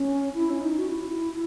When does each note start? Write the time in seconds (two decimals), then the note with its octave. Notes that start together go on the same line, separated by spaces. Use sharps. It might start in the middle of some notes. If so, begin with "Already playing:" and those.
Already playing: C#4
0.34 E4
0.50 C#4
0.61 D#4
0.78 F#4
0.88 E4